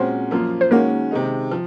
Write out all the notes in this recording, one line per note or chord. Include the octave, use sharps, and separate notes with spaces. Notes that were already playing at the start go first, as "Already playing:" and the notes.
Already playing: A#2 G#3 C4 C#4 F#4 C5
F#2 F3 A#3 F4
C5
D#3 G#3 A#3 C#4 F#4 A#4
C3 D#3 G#3 D#4
F3